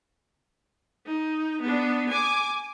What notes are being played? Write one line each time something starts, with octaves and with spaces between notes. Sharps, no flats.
D#4
B3 D4
G#5 D6